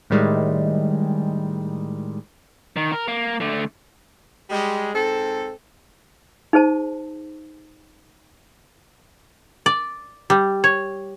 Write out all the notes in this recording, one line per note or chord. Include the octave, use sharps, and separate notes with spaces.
A2 D#3 G3 G#3
D#3
A#4
A#3
D3 A3
G3 G#3
G#2 C4 A4
D#4 G#4 C5 A5
D5
G3
C#5